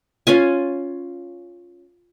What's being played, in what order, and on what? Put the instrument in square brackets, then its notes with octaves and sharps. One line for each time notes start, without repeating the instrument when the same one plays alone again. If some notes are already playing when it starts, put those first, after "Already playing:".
[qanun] C#4 F4 G#5